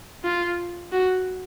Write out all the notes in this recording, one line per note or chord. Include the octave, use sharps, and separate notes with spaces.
F4
F#4